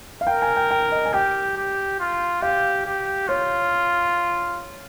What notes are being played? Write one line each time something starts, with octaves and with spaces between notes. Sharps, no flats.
F5
A#4 G5
G#5
G5
G5
D#5
G#5
G4 G5
G4
F4
G4 F5
G4
F4 C#5